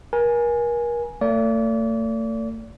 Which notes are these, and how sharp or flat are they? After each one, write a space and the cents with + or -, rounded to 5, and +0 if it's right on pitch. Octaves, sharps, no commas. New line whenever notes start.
A#4 +35 G#5 +0
A3 +40 D5 -35